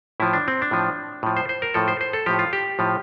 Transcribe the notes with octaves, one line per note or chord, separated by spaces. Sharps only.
A2 F3 E4
D4
C4
D4
A2 F3
A2 F3
C5
C5
A#4
A2 F3 A4
C5
C5
A4
A2 F3 G4
F4
G4
A2 F3